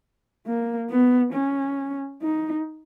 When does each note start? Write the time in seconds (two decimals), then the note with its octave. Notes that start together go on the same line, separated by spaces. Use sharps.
0.47 A#3
0.90 B3
1.33 C#4
2.22 D#4